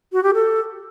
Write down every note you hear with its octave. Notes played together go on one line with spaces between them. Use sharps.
F#4
G4
A4